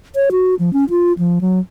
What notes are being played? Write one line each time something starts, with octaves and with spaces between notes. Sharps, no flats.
C#5
F#4
F3
C#4
F4
F3
F#3